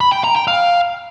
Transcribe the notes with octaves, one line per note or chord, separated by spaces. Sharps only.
B5
G5
A#5
G5
F5